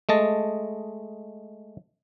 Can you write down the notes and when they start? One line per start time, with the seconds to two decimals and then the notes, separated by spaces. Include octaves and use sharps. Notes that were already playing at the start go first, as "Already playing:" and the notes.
0.09 G#3 A3 D#5 A5